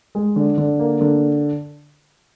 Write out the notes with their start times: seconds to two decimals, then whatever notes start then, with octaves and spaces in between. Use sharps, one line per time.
0.15 G#3
0.36 D3
0.58 D3
0.79 A#3
1.01 D3